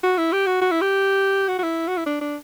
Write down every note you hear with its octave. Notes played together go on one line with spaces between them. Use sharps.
F#4
E4
G4
F#4
F#4
E4
G4
F#4
F#4
E4
F#4
E4
D4
D4